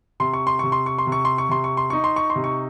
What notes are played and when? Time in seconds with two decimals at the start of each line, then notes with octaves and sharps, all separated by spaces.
0.20 C3 C6
0.33 C#6
0.47 C6
0.59 C3 C#6
0.72 C6
0.86 C#6
0.98 C6
1.07 C3
1.12 C#6
1.25 C6
1.38 C#6
1.49 C3 C6
1.64 C#6
1.77 C6
1.90 D#4 C#6
2.04 C6
2.16 C#6
2.30 C6
2.36 C3
2.44 C#6